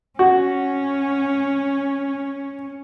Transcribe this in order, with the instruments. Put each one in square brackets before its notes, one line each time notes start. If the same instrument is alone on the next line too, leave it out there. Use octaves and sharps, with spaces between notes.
[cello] C#4 [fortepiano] F#4